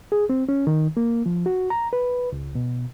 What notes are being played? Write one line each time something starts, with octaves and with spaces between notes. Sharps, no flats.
G#4
C4
C#4
D#3
A#3
F3
F#4
A#5
B4
C#2
B2